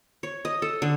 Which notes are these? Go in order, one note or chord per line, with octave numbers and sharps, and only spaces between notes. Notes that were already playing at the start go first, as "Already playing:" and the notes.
C#5
D#5
A4
D3